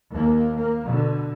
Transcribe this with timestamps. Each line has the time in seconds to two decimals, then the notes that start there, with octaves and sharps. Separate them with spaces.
0.11 D#2 A#3
0.56 A#3
0.84 B2 D3